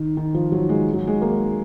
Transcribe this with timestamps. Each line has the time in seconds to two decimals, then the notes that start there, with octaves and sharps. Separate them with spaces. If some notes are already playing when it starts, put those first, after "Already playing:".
Already playing: D#3
0.17 D#3
0.34 F3
0.52 F#3
0.69 G#3
0.93 F#3
1.07 G#3
1.22 A#3